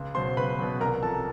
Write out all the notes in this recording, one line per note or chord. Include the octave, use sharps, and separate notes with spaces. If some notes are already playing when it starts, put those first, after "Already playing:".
Already playing: C#2
B2 F#3 C5 C6
C#2 B4 B5
B2 F#3
C2 A#4 A#5
C3 F3 A4 A5